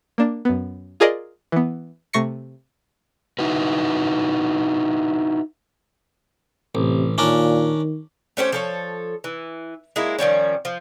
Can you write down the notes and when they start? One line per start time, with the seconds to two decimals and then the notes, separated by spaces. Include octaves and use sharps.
0.18 A#3 D4
0.45 F#2 B3
1.00 F4 G#4 A#4 D5 D#5
1.52 E3 B3
2.13 C3 A3 C#6 A#6 C7 C#7
3.39 D#4 E4 F#4 B4
6.75 A1 C3
7.18 A#2 D#3 C#4 D4 A#4
8.37 A3 C#4 G4 C5
8.52 F3 A4 C#5
9.24 E3
9.96 G#3 A#3 E4
10.19 D#3 F3 G3 C#4
10.65 F3